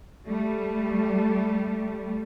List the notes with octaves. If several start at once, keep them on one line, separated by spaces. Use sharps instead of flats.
G3 A3